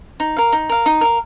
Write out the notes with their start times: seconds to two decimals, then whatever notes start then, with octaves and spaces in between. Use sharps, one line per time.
0.20 D#4
0.37 A#4 F5
0.53 D#4
0.69 A#4 F5
0.86 D#4
1.01 A#4 F5